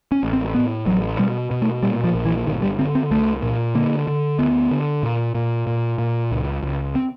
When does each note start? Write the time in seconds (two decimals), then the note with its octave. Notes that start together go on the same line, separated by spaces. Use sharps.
0.12 C#4
0.23 A1
0.33 C4
0.55 A2 B3
0.86 A1 F#3
1.19 B2 G3
1.51 B2
1.62 A3
1.83 A#2 G3
2.04 F3
2.14 A#1
2.25 E3
2.46 G1 D#3
2.62 G3
2.79 D3 C4
2.95 C4
3.11 C2 A3
3.42 A#2
3.75 D3 A#3
4.07 D3
4.39 D2 B3
4.71 D3
5.03 A#2
5.35 A#2
5.67 A#2
5.98 A#2
6.31 C#2
6.63 C#2
6.95 C4